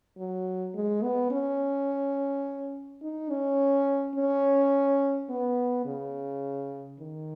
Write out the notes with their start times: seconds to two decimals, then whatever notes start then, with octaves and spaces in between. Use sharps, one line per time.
0.18 F#3
0.74 G#3
1.03 B3
1.31 C#4
3.03 D#4
3.30 C#4
4.16 C#4
5.30 B3
5.86 C#3
7.00 D#3